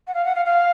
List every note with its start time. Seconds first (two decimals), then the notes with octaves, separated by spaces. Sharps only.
0.07 F#5
0.14 F5
0.25 F#5
0.35 F5
0.45 F5